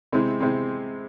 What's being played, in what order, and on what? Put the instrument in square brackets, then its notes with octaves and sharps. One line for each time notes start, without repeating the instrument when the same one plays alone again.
[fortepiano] C3 G#3 C4 E4
C3 G#3 C4 E4